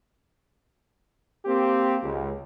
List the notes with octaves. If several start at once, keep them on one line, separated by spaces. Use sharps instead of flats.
A#3 C4 G4
C#2